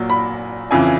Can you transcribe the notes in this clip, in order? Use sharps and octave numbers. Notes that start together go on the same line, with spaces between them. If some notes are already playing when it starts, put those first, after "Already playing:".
Already playing: A#1 A#2 F#3
B5
F2 C#3 E3 G#5